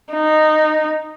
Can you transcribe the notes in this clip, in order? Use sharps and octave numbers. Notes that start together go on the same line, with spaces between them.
D#4